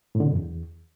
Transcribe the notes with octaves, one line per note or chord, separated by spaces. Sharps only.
A2
D3
B2
F#2
E2